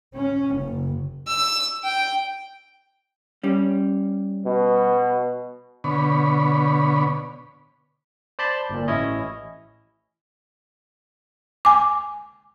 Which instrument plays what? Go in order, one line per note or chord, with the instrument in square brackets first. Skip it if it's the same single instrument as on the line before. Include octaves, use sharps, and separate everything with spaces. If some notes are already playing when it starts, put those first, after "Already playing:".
[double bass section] C#4
F#1
[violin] E6
G5
[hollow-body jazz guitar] G3 C#4
[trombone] B2
[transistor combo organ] B2 D3 C#5 B5
[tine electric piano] C5 D5 A5 B5 C6
G1 A#2
A1 C#4 E4 C#5 D#5
[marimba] G#5 D6